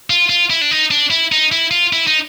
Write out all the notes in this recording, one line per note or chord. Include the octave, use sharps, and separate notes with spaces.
F4
F4
E4
D4
D#4
D4
E4
D#4
E4
F4
E4
D#4